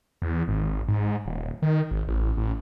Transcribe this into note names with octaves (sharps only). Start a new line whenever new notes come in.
E2
G#1
G#2
D#1
D#3
G#1
A1
A1